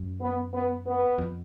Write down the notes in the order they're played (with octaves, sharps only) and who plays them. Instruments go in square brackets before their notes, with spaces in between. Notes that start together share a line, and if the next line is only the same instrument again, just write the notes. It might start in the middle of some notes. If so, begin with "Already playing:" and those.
Already playing: [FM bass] F#2
[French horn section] B3
B3
B3
[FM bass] F2